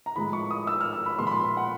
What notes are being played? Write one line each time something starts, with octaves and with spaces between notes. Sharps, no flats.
A#5
A2 F3 G#3 B5
C#6
D#6
E6
F6
E6
B5
A#2 F3 G#3 C6
B5
C6
B5
F#5